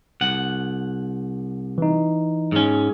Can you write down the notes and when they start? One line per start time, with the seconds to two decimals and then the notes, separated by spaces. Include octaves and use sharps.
0.21 C2 F#5
1.78 E3 D#4
2.52 G#2 C#4